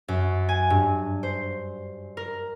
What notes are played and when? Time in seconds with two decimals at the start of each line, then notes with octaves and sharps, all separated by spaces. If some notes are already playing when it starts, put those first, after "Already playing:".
0.08 F#2
0.49 G#5
0.70 G2
1.23 C5
2.17 A#4